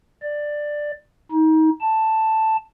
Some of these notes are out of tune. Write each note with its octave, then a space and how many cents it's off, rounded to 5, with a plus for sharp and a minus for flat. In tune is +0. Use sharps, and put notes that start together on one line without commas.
D5 +10
D#4 +30
A5 +5